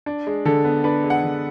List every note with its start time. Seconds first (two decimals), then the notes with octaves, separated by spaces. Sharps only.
0.06 D4
0.27 G#3
0.45 D3 A4
0.64 B3
0.84 D4 B4
1.04 G#3
1.10 F#5
1.23 D3